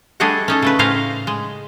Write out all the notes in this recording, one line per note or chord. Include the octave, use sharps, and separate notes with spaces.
G3 A3 D4 G#4 D#5 F#5
C#4 D#4 A4
C#3 A3 B4
A2 C#3 C#4 C5 F5 A#5
G#3